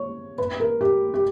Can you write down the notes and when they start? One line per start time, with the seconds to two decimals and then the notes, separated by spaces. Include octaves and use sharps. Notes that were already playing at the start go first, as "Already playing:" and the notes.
Already playing: C#5
0.38 B4
0.60 A#4
0.81 G4
1.14 G4